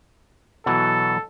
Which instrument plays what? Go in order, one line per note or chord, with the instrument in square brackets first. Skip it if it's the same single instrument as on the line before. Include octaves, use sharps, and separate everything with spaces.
[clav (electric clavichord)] B2 E3 F#3 [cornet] A4